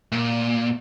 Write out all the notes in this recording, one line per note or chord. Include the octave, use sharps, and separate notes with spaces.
A#2